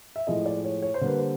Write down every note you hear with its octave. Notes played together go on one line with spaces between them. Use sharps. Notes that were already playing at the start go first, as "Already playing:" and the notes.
E5
A2 F3 G#3 D#5
D5
C#5
C#5
C5
D3 G3 A#3 B4
C5